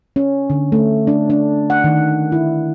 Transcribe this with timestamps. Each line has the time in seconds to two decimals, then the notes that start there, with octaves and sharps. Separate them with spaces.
0.16 C#4
0.50 D3
0.72 A3
1.07 D4
1.30 D4
1.70 F#5
1.84 D#3
2.32 E4